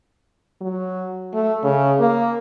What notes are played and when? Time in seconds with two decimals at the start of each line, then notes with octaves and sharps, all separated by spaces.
0.61 F#3
1.34 A3
1.64 C#3
2.00 A#3